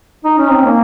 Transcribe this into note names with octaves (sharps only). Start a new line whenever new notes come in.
D#4
C#4
C4
A#3